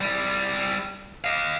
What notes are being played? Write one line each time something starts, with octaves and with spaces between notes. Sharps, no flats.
G3 E4
D#5 F5